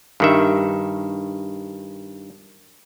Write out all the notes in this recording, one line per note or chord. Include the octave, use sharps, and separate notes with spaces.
G2 D#3 E5